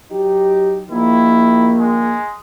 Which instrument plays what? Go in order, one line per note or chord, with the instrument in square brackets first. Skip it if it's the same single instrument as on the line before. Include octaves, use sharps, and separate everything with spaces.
[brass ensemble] F#3 D#4 G4
[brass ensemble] A#1 D#3 A#3 [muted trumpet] E4
[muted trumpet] G#3